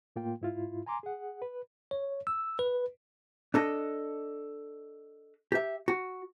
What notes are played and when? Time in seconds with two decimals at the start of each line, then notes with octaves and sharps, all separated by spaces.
0.16 A2 A#3 F4 G5
0.41 G#2 E4 F4
0.86 G#5 A#5 C6 D6
1.03 G#4 F#5
1.42 B4
1.91 C#5
2.27 E6
2.59 B4
3.54 D4 A4 D#5
5.52 G4 E5
5.88 F#4